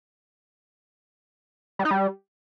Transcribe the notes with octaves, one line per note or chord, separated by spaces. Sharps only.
G3
D#4
G3